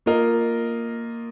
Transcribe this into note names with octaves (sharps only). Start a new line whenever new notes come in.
A#3 F4 A#4 D#5